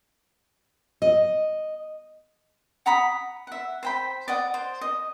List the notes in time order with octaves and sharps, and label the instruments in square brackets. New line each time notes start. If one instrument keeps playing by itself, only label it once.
[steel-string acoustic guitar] D#5
[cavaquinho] F#5 A#5 B5 D#6
E5 F#5
C5 G5 B5
D5 D#5 F#5
C5
D#5